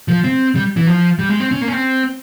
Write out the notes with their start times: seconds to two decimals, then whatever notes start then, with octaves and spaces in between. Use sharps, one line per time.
0.08 F3
0.24 C4
0.55 G3
0.77 E3
0.87 F3
1.19 G3
1.29 G#3
1.40 C4
1.51 C#4
1.61 A#3
1.68 C#4
1.72 C4